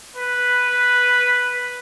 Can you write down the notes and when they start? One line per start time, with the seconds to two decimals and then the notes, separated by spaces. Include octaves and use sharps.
0.17 B4